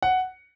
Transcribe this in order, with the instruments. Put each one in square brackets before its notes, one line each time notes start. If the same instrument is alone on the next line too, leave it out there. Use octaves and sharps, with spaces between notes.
[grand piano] F#5